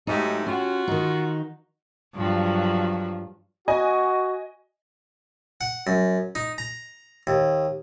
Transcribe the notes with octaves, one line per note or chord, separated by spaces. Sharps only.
G#2 F#3 A3 D#4 G4
C#4 F4 F#4
D#3 D#4
G2 F3 F#3
F#4 D#5 G#5
F#5
F#2
D#4
A#5
D#2